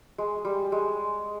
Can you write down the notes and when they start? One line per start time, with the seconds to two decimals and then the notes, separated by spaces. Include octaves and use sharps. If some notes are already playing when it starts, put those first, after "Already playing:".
0.18 G#3
0.45 G3
0.72 G#3